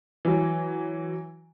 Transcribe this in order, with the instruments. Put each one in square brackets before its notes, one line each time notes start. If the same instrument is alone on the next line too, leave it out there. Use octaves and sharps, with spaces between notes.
[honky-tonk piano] E3 F#3